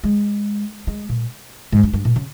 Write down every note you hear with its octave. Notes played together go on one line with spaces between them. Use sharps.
G#3
G#3
A#2
G#2
G2
G2
A#2
C#3